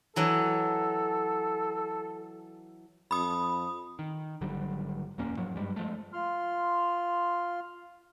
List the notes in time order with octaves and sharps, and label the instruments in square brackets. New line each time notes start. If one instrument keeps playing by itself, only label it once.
[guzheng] E3 F#3 [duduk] A4
[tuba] F2 [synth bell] B5 D#6
[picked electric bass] D#3
G#1 D3 F#3 G3
D#1 F2 A#3 C#4
G#2 F3 F#3
G2 G3 G#3
F3 G#3 A3
[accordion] F4 C6 F6